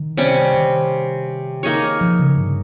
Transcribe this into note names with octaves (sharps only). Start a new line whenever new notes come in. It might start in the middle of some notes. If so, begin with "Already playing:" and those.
Already playing: D#3
C3 G3 C#4
D#3
A#3 D#4 G#4 C#5
F3
C#3
G2